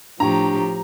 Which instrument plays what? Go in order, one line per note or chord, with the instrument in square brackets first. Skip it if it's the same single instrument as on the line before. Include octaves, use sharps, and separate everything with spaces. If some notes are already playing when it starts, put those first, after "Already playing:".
[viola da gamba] A2 F3 G4 [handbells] D4 G5 C#6 [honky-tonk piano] A#5